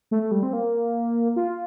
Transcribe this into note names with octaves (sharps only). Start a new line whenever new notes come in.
A3
G3
C4
A#3
F4